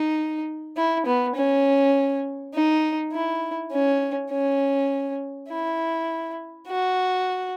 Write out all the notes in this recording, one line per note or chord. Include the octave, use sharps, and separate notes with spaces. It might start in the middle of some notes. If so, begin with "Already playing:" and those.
Already playing: D#4
E4
B3
C#4
D#4
E4
C#4
C#4
E4
F#4